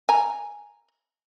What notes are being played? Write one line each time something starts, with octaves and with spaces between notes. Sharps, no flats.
G#5 A#5